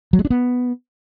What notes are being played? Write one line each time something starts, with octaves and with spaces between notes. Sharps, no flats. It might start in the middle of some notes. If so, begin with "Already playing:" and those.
F#3
G#3
D4
B3